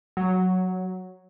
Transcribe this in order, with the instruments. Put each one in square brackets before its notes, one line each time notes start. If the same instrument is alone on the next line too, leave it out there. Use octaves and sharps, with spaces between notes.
[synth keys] F#3